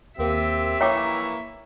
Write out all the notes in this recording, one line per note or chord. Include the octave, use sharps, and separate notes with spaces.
D#2 A#3 C4 G4 A#4 E5
E3 A#3 C#5 G5 A#5 C#6 D6